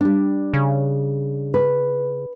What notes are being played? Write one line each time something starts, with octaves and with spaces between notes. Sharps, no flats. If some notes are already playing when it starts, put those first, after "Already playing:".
G3 D4
C#3
B4